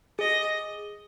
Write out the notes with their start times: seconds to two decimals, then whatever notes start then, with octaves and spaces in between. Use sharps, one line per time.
0.19 G#4 D#5